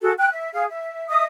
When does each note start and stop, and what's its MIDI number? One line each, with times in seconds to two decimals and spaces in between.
0.01 0.11 66
0.01 0.11 68
0.01 0.11 69
0.17 0.29 79
0.17 0.29 90
0.32 0.51 76
0.53 0.64 68
0.53 0.64 77
0.69 1.06 76
1.09 1.23 75
1.09 1.23 76
1.09 1.23 87